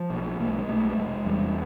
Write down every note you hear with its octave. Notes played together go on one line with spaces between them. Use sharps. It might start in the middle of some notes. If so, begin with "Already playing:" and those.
Already playing: F3
B1
B1 A#3
A3
G#3
B1 A3
A3
F1 G#3
E2 G3